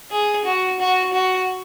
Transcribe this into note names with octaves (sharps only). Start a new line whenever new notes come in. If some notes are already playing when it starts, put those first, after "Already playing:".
G#4
F#4
F#4
F#4